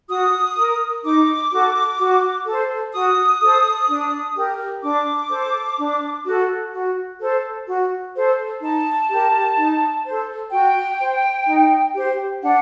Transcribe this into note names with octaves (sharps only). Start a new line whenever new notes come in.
F#4 D#6
A#4
D#4 D6
F#4 A4
F#4
A4
C5
F#4 D#6
A4 C5
D4
G4 A#4
D4 D6
A4 C5
D4
F#4 A4
F#4
A4 C5
F#4
A4 C5
D#4 A5
G4 A#4
D#4
A4 C5
F#4 G5
C5
D#4
G4 C5
D4 F#5